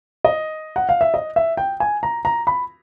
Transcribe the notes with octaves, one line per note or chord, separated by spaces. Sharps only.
D#5
F#5
F5
E5
D#5
E5
G5
G#5
A#5
A#5
B5